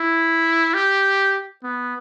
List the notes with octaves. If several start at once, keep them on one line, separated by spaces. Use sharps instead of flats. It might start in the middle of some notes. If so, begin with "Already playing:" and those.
Already playing: E4
G4
B3